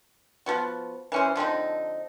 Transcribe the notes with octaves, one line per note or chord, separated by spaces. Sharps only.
F3 B3 F#4
E3 C#4 C5
D3 F3 C4 D#4